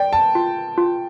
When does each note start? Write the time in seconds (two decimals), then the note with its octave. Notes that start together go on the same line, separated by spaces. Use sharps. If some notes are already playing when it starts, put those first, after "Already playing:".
Already playing: D5 G5
0.13 A5
0.35 F4
0.78 F4